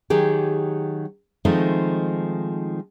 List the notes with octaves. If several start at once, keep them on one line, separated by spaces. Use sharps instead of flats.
D#3 F#3 G4 G#4
D#3 F3 G#3 A3 C4 D#4